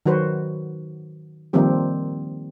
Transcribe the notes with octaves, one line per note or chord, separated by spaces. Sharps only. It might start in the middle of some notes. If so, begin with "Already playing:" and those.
D#3 F#3 F#4 B4 C5
D#3 F3 G3 A#3 C4 G4